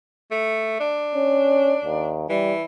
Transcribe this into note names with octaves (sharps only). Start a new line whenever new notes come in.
A3
D4
C#4
D#2
E3 G3